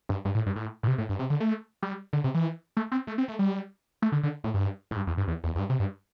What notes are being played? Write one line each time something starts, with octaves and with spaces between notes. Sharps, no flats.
G2
G2
A2
G2
A2
A2
C3
A2
G2
C3
D3
A3
G3
D3
C3
E3
A3
C4
A3
C4
A3
G3
A3
D3
D3
A2
G2
A2
G2
E2
G2
E2
E2
E2
G2
C3
G2